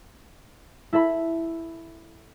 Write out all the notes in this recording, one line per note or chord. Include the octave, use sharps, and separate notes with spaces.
E4 A4 E5 B5